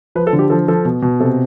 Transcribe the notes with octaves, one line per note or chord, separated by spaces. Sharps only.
F3 B4
A4
D3
G4
F3 A4
F3 A4
B2
B2
C3 A4